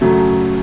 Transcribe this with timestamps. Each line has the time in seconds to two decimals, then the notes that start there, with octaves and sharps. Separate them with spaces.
0.01 F#2 C#3 F#3 A3